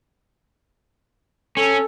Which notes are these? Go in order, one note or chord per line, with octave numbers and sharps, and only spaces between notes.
C#4 A4